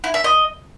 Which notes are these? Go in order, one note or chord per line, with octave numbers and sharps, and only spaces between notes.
E4
E5
D#5